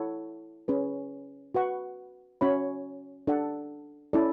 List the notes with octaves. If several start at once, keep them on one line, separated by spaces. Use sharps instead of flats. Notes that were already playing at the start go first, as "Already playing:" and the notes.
Already playing: E4 A4 C#5 F#5
C#4 G#4 B4
F#4 B4 F#5 C#6
C#4 F#4 C#5 E5 B5
D4 A4 D5 F#5
C#4 E4 A4 D5